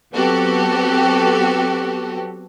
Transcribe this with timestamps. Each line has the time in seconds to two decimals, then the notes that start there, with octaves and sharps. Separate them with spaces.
0.13 F#3 B3 C4 F#4 G4 A4